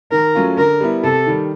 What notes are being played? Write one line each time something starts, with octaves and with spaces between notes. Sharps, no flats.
D#3 A#4
F#3 A3 C#4 F4
D3 A#4
G3 B3 E4
C3 A4
D#3 G3